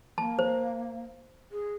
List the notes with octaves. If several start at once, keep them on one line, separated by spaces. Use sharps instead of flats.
A#3 A5
C5
G#4